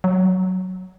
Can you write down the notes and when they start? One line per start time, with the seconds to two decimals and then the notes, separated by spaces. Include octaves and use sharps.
0.04 F#3